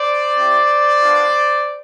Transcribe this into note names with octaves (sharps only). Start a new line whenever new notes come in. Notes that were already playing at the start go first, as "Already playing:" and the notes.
Already playing: C5 D5
C4 E4 G4
B3 D4 F4